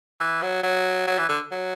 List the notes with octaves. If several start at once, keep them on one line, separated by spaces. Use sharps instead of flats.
E3
F#3
F#3
F#3
E3
D3
F#3